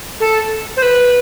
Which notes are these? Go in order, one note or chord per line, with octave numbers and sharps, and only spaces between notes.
A4
C5
B4